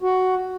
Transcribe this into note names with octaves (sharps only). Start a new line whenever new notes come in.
F#4